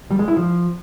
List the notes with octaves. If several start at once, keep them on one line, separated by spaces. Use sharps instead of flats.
G3
G#3
E4
F3